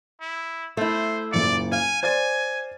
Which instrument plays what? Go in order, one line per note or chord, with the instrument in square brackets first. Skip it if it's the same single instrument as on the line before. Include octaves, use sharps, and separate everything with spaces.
[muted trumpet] E4
[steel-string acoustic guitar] A3 E4 [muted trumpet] C5
[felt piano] F#1 A#2 C#7 [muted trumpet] D5
[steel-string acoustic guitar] F5 [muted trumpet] G#5
[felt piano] C5 D5 A6 [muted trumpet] G#5